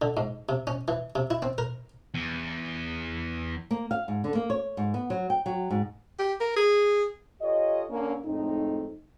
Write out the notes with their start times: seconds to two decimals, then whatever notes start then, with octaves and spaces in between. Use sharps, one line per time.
0.02 D3
0.17 G#2
0.49 C3
0.67 C#4
0.88 E3
1.15 C3
1.31 E4
1.42 C4
1.58 A#4
2.14 E2
3.71 A#3
3.91 F5
4.08 G#2
4.24 D3
4.35 A#3
4.50 C#5
4.77 G#2
4.94 B3
5.10 F#3
5.30 G5
5.46 F#3
5.70 G#2
6.19 G4
6.40 A#4
6.56 G#4
7.41 F4 G4 A4 C#5 D#5
7.90 D3 A#3 C#4
8.25 F2 A2 G#3 A3 C4 D#4